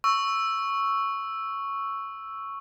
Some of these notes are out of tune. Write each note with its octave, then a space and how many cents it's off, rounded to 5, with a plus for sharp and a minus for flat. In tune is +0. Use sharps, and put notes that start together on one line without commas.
C#6 +0 E6 +0